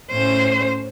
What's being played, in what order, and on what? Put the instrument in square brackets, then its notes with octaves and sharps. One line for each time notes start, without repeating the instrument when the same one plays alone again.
[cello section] A2 C#4 C5